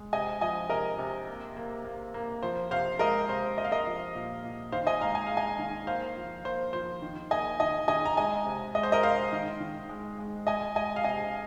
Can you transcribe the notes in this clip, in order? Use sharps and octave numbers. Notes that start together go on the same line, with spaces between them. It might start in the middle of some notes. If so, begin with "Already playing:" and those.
Already playing: G#3
C3 D#5 G#5
F3 D#5 G#5
C3 A#4 D#5
C3
A#3
A#3
A#3
A#3
F3 C5
C3 C5 F5
G#3 A#4 D#5
C3 C5
A#3 D#5
F5
A#4 D#5
F3
A#2
A#2
D#3 C5 F5
D#5 G#5
G#3 F5 A#5
G#5
G#3 F5
D#5 G#5
D#3
A#3 C5 F5
F3
A#3 C5
F3 C5
D#3
A#3 D#5 G#5
D#3 D#5 G#5
D#3 D#5 G#5
A#5
G#3 D#5 G#5
C3
G#3 D#5
C5
A#4 D#5
G#3 C5 F5
D#3
D#3
G#3
G#3
G#3 D#5 G#5
G#3 D#5 G#5
F5
C3 D#5 G#5